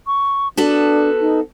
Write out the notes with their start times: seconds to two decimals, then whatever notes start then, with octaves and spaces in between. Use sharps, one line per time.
0.07 C#6
0.57 B3 D4 F#4 A4
1.21 D#4